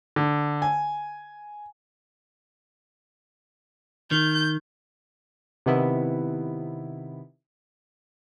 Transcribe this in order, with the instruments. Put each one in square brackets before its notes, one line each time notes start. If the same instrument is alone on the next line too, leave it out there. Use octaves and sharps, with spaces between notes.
[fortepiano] D3
G#5
[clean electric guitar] D#3 [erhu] G6
[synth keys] C3 D#3 B3 E4